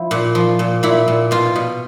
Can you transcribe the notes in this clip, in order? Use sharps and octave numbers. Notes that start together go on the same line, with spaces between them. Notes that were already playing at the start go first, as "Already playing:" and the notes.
Already playing: F3 E4
A#2
F3
A#2
A#2 E4
A#2
B2 F4
B2